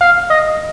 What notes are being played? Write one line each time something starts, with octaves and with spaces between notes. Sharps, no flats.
F5
D#5